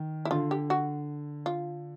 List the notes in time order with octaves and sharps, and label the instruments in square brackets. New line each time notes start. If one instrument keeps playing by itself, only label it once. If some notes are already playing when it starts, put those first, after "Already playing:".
Already playing: [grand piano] D#3
[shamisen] E4
[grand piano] D3 [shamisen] F4
[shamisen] G4
F#4
F4